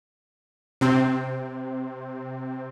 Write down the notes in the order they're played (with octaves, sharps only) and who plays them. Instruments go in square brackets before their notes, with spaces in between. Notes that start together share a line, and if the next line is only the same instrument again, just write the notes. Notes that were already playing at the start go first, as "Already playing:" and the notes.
[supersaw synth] C3 C4